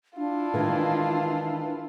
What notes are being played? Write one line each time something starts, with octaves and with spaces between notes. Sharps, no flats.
D4 E4 F4
D#3 E3 G#3